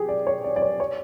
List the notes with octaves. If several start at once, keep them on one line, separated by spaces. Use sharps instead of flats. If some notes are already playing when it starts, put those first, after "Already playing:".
Already playing: G4 G#4
D5
C#5
D5
D5
C#5
C#5